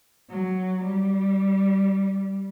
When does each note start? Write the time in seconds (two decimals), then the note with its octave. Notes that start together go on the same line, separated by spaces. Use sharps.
0.30 F#3
0.84 G3